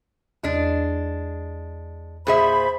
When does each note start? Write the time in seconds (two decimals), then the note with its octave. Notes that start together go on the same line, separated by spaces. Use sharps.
0.44 E2 G#3 D4
2.27 A#2 G#4 C5 E5 B5